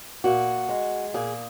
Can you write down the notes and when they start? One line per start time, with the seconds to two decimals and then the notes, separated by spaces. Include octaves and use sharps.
0.24 A#2 F#4
0.69 G#3
1.14 A#2 G#4